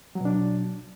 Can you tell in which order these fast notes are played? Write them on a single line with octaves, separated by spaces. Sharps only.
F#3 B2 D4